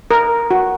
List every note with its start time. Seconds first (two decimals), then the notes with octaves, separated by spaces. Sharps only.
0.11 A#4
0.51 F#4